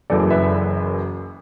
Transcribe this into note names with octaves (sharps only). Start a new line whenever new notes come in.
F#1 F#2 E3 A4 D5
B4 E5